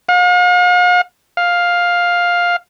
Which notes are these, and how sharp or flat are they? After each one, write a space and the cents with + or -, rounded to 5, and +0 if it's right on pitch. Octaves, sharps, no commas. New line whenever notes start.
F5 +45
F5 +10